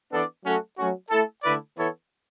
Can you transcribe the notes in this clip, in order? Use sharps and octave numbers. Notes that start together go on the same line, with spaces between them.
E3 B3 D4 A4 D5
F#3 A3 C#4 F#4 A4
F#3 A3 C#4 F#4
A3 E4 A4
D3 A3 E4 B4 D5
E3 B3 E4 A4 C#5